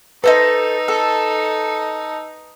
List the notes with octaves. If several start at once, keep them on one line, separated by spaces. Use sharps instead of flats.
D#4 A4 B4 C5 D#5
A4